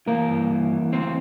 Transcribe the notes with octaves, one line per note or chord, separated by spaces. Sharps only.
E3 A#3 A#4
G2
E3
E3
D2 C4 C5